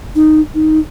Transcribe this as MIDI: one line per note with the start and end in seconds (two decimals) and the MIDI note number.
0.15 0.41 63
0.55 0.79 63